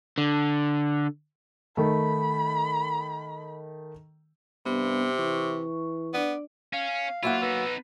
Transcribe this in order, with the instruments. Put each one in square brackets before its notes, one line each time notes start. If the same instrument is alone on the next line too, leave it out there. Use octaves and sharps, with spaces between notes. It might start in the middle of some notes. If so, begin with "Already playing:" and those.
[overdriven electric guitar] D3
[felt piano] D#3 A3 [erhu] B5
[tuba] G2 [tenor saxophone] C3 [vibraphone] B3
[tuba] E3 [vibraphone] C#6
[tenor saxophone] B3 [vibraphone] D4 D5
[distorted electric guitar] C#4 [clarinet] F5
[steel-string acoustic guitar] F#3 A#3 F#5 [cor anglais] E4 [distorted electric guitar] F4
[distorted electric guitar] B3 D#4 [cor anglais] B4 [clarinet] E6